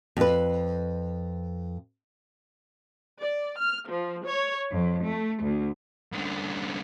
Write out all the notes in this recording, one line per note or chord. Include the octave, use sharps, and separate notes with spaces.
F2 B4
D5
F6
F3
C#5
F2
A3
D2
C2 D3